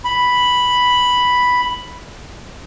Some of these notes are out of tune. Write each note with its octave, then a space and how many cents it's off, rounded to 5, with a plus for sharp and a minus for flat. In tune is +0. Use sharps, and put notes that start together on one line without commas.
B5 +0